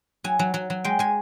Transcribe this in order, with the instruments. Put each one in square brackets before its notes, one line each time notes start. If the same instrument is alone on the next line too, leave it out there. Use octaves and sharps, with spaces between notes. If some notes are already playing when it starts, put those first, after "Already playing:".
[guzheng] F#3 G#5
F#3
F#3
F#3
G#3 G5
G#3 G#5